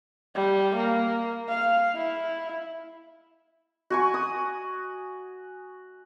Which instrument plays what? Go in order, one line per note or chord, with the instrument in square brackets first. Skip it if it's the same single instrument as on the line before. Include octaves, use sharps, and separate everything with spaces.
[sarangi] G3
A#3
F5
E4
[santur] F#4 G#5 C#6
D#6